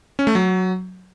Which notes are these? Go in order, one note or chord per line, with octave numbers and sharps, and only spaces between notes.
C#4
A3
F#3